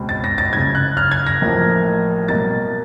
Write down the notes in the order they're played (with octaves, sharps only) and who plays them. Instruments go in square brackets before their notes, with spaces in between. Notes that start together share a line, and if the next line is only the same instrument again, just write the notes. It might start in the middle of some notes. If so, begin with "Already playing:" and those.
Already playing: [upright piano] C#2 B2 G#3 C4
A6
A#6
A6
F#1 F#2 C#3 G#6
F#6
F6
G#6
A#6
A1 A2 F3 A#3
C2 B2 F#3 A#3 A6